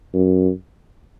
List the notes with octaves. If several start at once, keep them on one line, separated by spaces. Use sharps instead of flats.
F#2